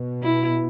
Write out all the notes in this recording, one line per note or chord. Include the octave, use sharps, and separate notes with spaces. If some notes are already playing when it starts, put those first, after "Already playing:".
Already playing: B2
E4